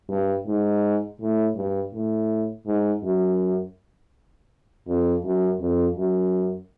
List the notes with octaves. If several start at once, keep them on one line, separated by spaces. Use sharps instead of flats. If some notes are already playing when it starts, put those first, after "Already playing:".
G2
G#2
A2
G2
A2
G#2
F#2
F2
F#2
F2
F#2